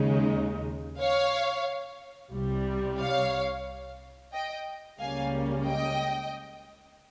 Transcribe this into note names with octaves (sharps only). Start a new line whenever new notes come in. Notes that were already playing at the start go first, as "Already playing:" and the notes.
Already playing: D#2 C#3 G#3 D#4
C#5 F5
C2 C3 G3
C#5 F5
D#5 G5
C#2 C#3 G3 A#3 C#4 F5 G#5
D#5 G5